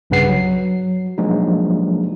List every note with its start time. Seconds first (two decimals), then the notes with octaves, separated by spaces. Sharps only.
0.10 B1 G2 C#3 B4 F#5 C7
0.29 F#3
1.18 F3 F#3 G#3 A#3 D4 D#4